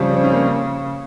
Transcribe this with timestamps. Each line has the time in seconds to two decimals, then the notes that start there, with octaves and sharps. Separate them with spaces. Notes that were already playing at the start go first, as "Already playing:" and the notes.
Already playing: C#3 F3 G3 C4
0.13 C4
0.24 C#4
0.33 A#3